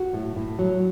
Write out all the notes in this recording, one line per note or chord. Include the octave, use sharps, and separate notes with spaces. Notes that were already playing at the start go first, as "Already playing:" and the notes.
Already playing: F#4
A2
A2
F#3